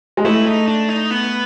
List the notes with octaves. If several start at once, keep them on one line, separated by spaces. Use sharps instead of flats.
G#3
A3 E4
D#4
D4
D#4
B3